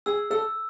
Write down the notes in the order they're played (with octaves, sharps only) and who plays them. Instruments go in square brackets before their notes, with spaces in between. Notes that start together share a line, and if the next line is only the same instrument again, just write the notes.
[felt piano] G#4 [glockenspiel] E6
[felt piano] A4 [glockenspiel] E6